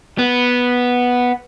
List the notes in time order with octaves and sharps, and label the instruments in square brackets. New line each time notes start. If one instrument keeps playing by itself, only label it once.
[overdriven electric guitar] B3